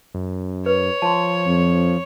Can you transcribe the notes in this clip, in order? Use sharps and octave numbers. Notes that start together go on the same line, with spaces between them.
F#2
B4 C#5
F3 A5 C6
F2